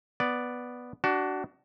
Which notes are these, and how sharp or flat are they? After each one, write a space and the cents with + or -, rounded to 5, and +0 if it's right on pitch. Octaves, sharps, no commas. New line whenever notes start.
B3 +0 D5 +0
D4 +0 F#4 +25